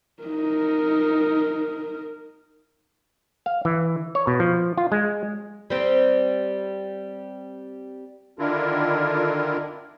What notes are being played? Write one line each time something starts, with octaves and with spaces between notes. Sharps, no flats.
D#4 A#4
F5
E3
C#5
B2
F3
F4
G#3
G3 C4
D3 D#3 D4 E4 F4 A#4